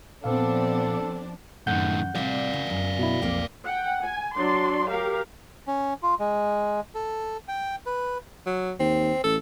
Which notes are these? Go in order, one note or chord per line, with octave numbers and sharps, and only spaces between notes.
A#2 F3 B3 C4 D4 A4 F5
F#2 A2 D#3 F#5 G6
C3 G3 D5 F5
C#3
F#2 G#3
B2 E4
B1 F2 A#3 G4
F#5 G5
G#5
F#3 D4 D5 C6
G4 A#4 F5
C#4
F4
G#3
A4
G5
B4
F#3
D#2 C4
A1 A4